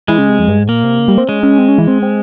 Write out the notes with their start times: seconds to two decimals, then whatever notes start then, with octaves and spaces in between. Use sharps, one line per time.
0.08 E3 G#3
0.18 C#3
0.29 C3
0.39 F2
0.48 G2
0.59 G#2
0.68 A#2 A#3
0.84 C3
0.99 C#3
1.08 G3
1.18 C4
1.28 G#3 C#4
1.43 C#4
1.59 C4
1.68 C#4
1.78 E3
1.88 C4
2.02 C4